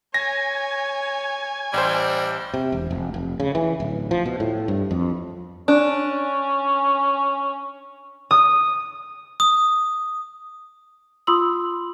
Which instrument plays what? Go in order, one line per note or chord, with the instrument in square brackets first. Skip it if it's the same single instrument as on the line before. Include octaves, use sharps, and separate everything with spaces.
[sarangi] C#5 [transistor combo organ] G#5 [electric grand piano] A#6
[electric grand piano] A1 C5 [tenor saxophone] G3
[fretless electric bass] C3
E1
F1
F1
C#3
E3
D1
F3
B2
A2
G2
F2
[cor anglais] C#4 [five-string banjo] D4
[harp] D#6
[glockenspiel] D#6
[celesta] F4 B5 C6 D#6 E6 F#7